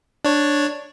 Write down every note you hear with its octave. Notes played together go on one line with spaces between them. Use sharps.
D4 C#5